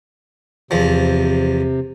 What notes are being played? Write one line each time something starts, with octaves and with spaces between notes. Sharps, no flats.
E2 C3 F3